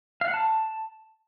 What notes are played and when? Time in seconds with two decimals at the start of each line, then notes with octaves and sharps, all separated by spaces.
0.21 F5
0.28 F#5
0.34 A5